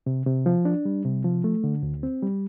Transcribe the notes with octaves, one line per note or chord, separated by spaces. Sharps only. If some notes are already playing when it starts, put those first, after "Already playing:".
C3
C3
F3
D4
G3
C3
F3
A3
D3
D2
C4
G3